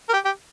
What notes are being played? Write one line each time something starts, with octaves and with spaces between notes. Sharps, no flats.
A#4
G4
G4